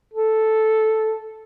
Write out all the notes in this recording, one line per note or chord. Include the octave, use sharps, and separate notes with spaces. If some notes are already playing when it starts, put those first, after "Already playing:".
A4